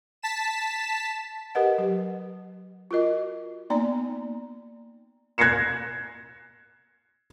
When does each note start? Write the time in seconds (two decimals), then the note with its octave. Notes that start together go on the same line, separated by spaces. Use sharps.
0.22 A5 B6 E7
1.55 G4 A#4 B4 D#5 F#5
1.78 F#3 G4
2.91 F4 F#4 A#4 D#5
3.70 A#3 B3 D#4 D5 A#5
5.38 F#6 G#6 A#6 C7 C#7 E7